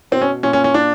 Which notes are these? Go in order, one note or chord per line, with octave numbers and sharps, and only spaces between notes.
B2 C4
C#4
A#2 C#4
C#4
C#4
A#2 D4